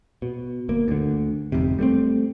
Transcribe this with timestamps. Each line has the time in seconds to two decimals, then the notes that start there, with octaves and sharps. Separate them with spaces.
0.22 B2
0.69 G1 A#3
0.88 D2 D3
1.52 G1 F2 G#2 C3
1.79 G3 A3 B3 C4